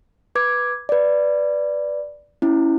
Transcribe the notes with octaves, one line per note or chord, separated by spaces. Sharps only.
B4 D6 G#6
B4 D5
C#4 E4